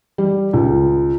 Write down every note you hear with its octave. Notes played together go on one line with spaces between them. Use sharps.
G3
C#2